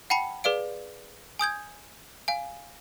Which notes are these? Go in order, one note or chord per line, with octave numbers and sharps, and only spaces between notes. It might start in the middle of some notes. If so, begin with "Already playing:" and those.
F#5 G5 A5 B5 C#7
G#4 B4 D5 F5 D7
G#5 D#6 G6 G#6
F5 G#5